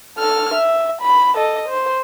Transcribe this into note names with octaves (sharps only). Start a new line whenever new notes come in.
A4 F6
E5
B5
A4 D#5
C5